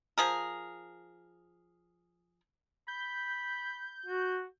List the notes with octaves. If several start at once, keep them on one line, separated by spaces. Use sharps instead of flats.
F3 G#4 A#4
B5 G6
F#4